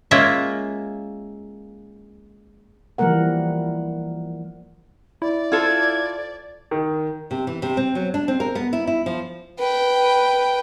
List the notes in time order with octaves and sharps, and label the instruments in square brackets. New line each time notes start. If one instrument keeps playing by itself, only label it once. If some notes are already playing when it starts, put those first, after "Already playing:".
[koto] G#3 A#3 C#4 F4 A#4 E5
[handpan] E3 F3 G3 A#3 A#4 F#5
[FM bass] E4 [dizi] D5
[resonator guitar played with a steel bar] F4 A4 C5 [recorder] G#6
[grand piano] D#3
[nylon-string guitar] C3
E3
C3
C4
F#3
D4
C4
A#4
B3
E4
E4
F3
[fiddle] B4 G5